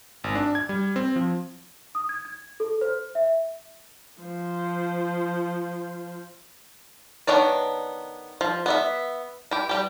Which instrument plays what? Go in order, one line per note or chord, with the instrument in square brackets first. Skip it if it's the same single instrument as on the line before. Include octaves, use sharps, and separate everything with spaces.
[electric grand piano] G#1
D4
G#6
G3
C4
F3
[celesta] D#6
G#6
G#6
A4
C5
E5
[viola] F3 C5
[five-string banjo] D#3 B3 D4 C#5 D5
F3
B3 D5 E5
E4 G4
G3 G4